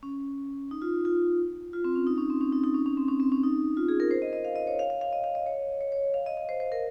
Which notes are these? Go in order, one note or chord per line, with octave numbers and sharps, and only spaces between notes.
C#4
D#4
F4
F4
F4
C4
C#4
D#4
C#4
C4
C#4
D#4
D#4
C#4
C#4
C4
C#4
C4
C#4
D#4
F4
G#4
A#4
C5
D#5
D#5
F5
D#5
C#5
F5
F5
F5
D#5
F5
D#5
C#5
C#5
C#5
F5
D#5
D#5
C5
C5
A#4